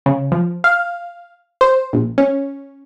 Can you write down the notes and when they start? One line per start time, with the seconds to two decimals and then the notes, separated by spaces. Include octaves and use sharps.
0.06 C#3
0.32 F3
0.64 F5
1.61 C5
1.93 A#1
2.18 C#4